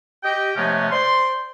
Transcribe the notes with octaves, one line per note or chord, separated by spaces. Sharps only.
G4 D#5 G5
C3 F3 G#3 A3 B3 C#4
C5 D5 C6